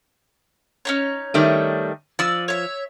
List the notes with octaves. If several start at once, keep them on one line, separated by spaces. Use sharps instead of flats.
C#4 D#4 C#5
D#3 G3 A3
F3 D5 E6
C#5 E5